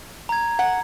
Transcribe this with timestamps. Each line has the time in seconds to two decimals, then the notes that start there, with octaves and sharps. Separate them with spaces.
0.29 A#5 G#6
0.59 F#5